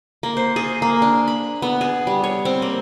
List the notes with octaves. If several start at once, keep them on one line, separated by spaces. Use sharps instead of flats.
A#3
C5
G#4
A#3
D4
B5
B3
G#4
G3
C#5
C4
A#3